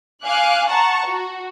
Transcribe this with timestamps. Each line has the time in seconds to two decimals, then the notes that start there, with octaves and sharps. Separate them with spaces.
0.24 F5 G#5 D6 F#6
0.68 F#5 A5 A#5 C#6
1.05 F#4